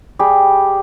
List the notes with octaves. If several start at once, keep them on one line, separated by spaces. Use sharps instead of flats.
G3 G4 G#4